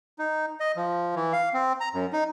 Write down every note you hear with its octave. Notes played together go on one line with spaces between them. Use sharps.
D#4
D#5
F3
E3
F5
C4
A#5
F#2
D#4